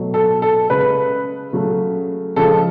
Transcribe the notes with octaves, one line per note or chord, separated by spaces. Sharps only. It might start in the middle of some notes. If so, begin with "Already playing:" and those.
Already playing: B2 F#3 A3
A4
A4
C#3 G#3 B4
C#3 F#3 A3
C#3 F3 G#3 A4